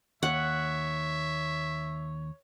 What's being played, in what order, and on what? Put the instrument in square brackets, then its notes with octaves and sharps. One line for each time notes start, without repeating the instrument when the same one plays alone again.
[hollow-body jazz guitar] D#2 [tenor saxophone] C#5 [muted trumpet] E5 [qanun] F#5